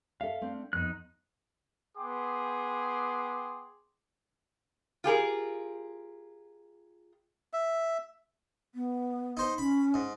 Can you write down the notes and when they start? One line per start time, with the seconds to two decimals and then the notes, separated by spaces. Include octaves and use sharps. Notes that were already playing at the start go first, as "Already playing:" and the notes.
0.21 A4 E5 F5
0.41 A3 C4 D4
0.73 F2 B3 D#4 F#6
1.98 B3 G#4 G5 C6 D6
5.04 F4 G4 G#4 A#4
7.53 E5
8.75 B3
9.37 D#4 C5
9.58 C#4 B5
9.94 G#2